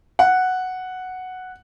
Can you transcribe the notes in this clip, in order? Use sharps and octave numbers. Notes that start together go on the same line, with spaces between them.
F#5